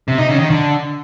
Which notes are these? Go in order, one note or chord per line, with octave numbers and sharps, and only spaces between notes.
C3
D#4
C#3
D#3
D3